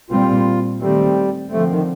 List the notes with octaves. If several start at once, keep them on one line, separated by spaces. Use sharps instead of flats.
A#2 G3 C4 F4
D#3 G3 A3 C4
D3 F3 A3 C4
D#3